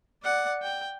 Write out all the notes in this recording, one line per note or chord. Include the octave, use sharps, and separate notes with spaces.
D5 F#5
G5